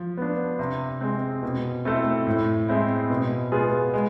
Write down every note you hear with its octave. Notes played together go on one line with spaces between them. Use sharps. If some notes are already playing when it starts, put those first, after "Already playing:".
Already playing: F3
B3 D4
C3
G#3 C4
B2
A3 C4 E4 A4
A2
G#3 C4 E4
B2
B3 F4 G#4
G#3